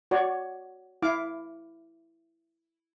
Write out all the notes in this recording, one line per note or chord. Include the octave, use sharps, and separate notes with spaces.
F#4 C#5 D5
E4 F5 D6